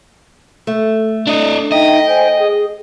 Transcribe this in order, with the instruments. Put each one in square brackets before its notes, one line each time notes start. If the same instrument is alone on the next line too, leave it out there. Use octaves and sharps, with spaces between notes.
[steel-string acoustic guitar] A3
[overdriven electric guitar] D4 D#5
[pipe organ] D#4 E5 G5 [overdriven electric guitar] D#5
[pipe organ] C5 G5 G#5
G#4